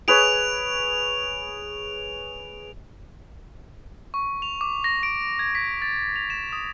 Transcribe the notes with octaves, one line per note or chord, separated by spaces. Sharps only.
G#4 B4 C#5 D7 F7
C#6
F7
D6
A#6
D7
G#6
B6
A6
F7
E7
D#6